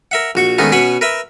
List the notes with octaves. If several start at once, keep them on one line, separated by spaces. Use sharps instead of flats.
A#4 E5 F#5
A#1 F#4 C#6
D#3 G#3 A3 B3 C#4 D#4
B2 C#4 B4 F#5 B5 C#6
A#4 B4 E5